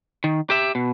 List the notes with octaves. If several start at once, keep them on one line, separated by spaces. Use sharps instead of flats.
D#3
G4 E5
B2